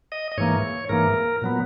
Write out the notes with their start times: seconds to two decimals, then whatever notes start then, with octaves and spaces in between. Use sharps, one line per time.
0.12 D#5
0.32 D#5
0.38 G#2 E3 A#3 C#5
0.89 G#2 E3 A#3 A#4
1.42 A#2 F#3 B3